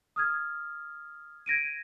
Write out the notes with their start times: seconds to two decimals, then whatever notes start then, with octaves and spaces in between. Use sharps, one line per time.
0.16 D#6 F6 G#6
1.46 G#6 A#6 D7 D#7